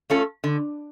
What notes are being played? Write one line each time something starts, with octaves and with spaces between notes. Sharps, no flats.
A3 C#4 F4 A4
D3